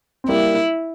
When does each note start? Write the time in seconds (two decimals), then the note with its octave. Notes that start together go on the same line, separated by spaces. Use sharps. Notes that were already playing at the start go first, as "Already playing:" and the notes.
0.24 C4
0.28 G3 A#3 E4